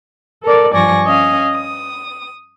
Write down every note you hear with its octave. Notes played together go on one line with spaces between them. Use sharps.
A4 A#4 D5
G2 F3 D5 G#5 C#6 A#6
C#4 D#5 F5 G#5
D#6